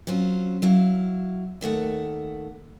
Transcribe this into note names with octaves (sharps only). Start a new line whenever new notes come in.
F#3 C4 C#4 F4
F#3 E4 F5
D#2 D#3 A3 F#5